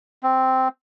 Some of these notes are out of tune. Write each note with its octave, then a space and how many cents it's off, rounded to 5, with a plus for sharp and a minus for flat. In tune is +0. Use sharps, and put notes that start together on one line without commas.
C4 -5